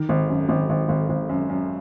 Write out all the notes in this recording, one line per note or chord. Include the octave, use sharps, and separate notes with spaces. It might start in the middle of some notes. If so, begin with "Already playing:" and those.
Already playing: D#3
G#1
F#2
G#1
G#1
G#1
G#1
F#2
F#2